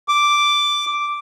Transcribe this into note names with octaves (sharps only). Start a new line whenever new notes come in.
D6